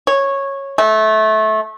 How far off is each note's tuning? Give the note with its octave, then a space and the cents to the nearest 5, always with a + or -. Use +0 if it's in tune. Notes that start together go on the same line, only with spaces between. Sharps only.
C#5 -10
A3 -20